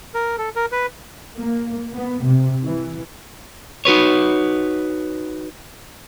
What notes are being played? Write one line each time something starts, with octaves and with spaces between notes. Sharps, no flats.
A#4
A4
A#4
B4
A#3
B3
C3
E3
D#4 F#4 B4 C#5